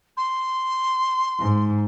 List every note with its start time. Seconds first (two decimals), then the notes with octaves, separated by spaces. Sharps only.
0.17 C6
1.40 G#2